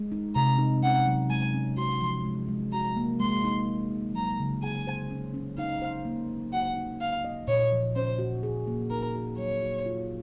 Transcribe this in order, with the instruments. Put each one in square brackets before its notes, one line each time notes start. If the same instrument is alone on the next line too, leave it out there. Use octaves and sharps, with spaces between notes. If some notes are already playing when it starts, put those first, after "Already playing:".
Already playing: [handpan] G#3
D#4
[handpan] C3 [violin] A#5
[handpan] D#4
[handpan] C#4 [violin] F#5
[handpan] F#3
[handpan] G#3 [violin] G#5
[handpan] C#4
[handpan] F#4 [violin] C6
[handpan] F3
G#3
G#3
[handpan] F#4 [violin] A#5
[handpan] A#3
[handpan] G#3 [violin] C6
[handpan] D#4
D#4
D#4
[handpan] F#3 [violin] A#5
[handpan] C#3
[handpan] G#4 [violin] G#5
[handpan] C5
C#4
C#4
[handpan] D#4 [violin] F5
[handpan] C5
A#3
F#3
[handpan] F#4 [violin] F#5
[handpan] D#4
[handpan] D#4 [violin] F5
[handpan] D#5
[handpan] A#2 [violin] C#5
[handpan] F3
[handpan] C#4 [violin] C5
[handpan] F#4
G#4
A#3
[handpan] D#4 [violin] A#4
[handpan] F#4
[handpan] F#3 [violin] C#5
[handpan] F#4
F4